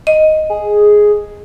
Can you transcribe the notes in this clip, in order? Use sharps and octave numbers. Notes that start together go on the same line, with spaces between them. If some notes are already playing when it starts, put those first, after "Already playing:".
D#5
G#4